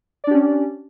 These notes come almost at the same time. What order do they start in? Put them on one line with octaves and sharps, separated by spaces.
D5 D4 G4 C#4